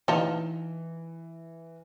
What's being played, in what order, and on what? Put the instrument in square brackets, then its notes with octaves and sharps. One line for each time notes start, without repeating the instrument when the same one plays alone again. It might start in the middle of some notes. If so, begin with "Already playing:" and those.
[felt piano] E3 [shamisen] D#4 F4 A5